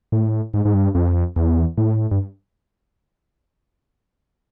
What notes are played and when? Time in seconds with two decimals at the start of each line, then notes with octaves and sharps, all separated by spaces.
0.12 A2
0.54 G#2
0.65 G#2
0.74 G2
0.95 F2
1.36 E2
1.78 A2
2.11 G2